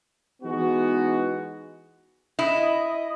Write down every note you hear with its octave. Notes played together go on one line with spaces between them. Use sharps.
E3 G#3 B3 D#4 F#4
E4 D#5